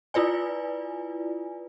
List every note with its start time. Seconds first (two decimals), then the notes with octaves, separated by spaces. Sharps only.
0.14 E4 F4 B4 D5 G#5